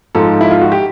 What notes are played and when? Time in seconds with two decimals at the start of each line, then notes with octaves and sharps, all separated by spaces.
0.15 G#2 F3 A4
0.41 E4
0.51 F4
0.62 F#4
0.72 G4